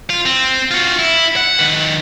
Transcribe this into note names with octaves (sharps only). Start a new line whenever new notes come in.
F4
C4
F4 F#4
E4
F#5
D#3 B4